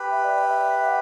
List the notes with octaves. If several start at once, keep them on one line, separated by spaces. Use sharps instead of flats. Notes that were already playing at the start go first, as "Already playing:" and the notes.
Already playing: G4 B4
E5
D5
E5
F#5